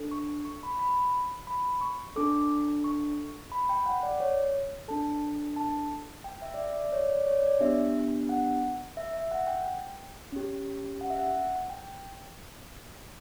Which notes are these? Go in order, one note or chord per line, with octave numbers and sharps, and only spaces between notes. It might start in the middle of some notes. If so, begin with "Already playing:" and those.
Already playing: D4 A4
C#6
C#6
B5
B5
B5
C#6
D4 A4 D6
C#6
B5
G5
F#5
D5
C#5
D4 A4 A5
A5
G5
E5
D5
E5
D5
D5
C#5
D5
C#5
D5
B3 D4 G4 E5
F#5
E5
E5
F#5
G5
C#4 G4
F#5
E5
F#5
G5